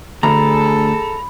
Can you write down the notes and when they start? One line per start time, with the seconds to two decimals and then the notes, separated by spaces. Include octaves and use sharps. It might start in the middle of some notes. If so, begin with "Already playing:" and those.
0.23 D2 G#4 A4 A#5 B5